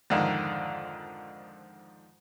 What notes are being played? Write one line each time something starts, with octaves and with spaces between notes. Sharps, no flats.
F2 G#2 D3 D#3